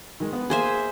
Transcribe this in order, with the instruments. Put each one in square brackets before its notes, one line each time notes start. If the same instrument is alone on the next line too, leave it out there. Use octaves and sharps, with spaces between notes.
[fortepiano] D#3 G#3
B3 B4
[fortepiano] A#3 [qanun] G#4 C5 E5